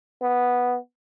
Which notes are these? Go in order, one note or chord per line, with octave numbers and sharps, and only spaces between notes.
B3